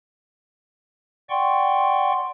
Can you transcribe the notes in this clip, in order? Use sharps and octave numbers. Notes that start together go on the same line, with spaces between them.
D5 F#5 G5 C6 C#6